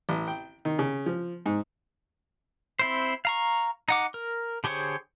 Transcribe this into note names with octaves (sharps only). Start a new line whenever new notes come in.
A1
G5
D#3
C#3
F3
G#2
C4 E4 C5
F5 A#5 C#6
D#4 F#5 D6
A#4
D3 G4 G#4 C5 C#5